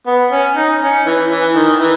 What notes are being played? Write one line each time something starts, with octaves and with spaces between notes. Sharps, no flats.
B3
C#4
D#4
C#4
E3
E3
D#3
E3